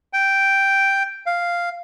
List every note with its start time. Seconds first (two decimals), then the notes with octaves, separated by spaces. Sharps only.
0.13 G5
1.26 F5